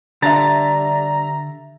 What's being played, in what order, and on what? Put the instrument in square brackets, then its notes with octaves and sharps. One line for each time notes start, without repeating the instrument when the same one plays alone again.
[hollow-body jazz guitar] D3 [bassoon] G3 [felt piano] E5 A6 [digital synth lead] A#5